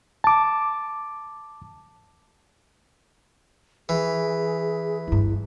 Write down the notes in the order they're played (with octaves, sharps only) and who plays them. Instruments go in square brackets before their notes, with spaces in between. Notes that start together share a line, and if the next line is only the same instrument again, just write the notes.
[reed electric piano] A5 D6
[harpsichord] E3 [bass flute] G#4
[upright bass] G1 G2 [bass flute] E4